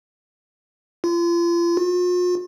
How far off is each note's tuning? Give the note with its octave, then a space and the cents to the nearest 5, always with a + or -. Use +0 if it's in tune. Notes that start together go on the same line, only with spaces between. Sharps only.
F4 -35
F4 +45